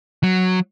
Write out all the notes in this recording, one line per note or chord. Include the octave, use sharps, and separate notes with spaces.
F#3